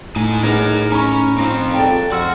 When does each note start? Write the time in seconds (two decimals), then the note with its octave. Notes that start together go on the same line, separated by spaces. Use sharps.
0.16 A2 D#4 G#5
0.43 D#4 G#4 A#4 B4 C#5
0.92 C#4 D#4 A#5 B5 C#6
1.38 C4 D#4 F4
1.74 A4 D5 G5 A5
2.12 F2 F#4 C6 E6 F6